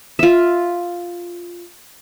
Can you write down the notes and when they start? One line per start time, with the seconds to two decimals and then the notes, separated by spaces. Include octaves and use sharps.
0.19 F4 E5